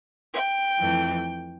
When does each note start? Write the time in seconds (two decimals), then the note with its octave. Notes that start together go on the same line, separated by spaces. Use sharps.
0.34 G5
0.79 F2 E3 A3